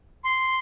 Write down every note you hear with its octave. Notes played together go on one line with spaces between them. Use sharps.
C6